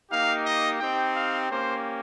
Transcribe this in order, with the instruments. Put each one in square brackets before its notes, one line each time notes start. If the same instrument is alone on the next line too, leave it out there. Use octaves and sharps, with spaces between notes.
[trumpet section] A#3 D#4 G4 F5
D#5
C4 D#4 G4 G5
F5
A#3 C#4 G4 C5